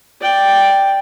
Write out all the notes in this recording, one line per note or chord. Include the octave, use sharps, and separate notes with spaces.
D5 G5